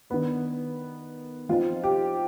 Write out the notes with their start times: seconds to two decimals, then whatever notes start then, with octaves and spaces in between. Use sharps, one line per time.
0.10 D#3 B3 D4 B4
1.49 F3 C4 D#4 F4
1.84 G4